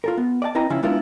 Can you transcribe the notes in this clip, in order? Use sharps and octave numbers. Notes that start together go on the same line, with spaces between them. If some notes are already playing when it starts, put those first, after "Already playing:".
F4 A4 A#4
B3
D5 D#5 F#5 A5
C4 E4 B4 D#5 G#5 A#5
C#3 F3 C#4 E4 F4
G#3 B3 D4 E4 F4 A#4